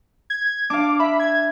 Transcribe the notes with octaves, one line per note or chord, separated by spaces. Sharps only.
G#6
D4 F5 D6
E5 B5
G#6